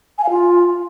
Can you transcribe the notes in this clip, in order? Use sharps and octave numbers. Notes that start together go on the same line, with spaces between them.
G#5
F5
F4